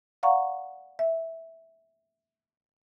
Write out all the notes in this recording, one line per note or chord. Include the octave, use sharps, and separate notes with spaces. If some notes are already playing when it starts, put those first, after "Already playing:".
D5 F5 F#5 A#5 C#6
E5